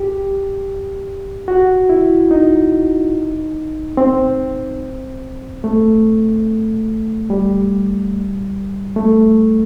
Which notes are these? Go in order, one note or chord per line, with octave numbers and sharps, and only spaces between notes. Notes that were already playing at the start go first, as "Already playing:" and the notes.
Already playing: G4
F#4
E4
D#4
C4
A3
G3
A3